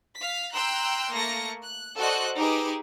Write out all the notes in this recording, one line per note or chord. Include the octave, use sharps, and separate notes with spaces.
F5 B6
G5 A#5 C6 E6 F#6
A3 A#3 A#6 C#7
F#6
F#4 A4 C5 D5 D#5 F#6
D#4 G4 G#4 B4 D6 E6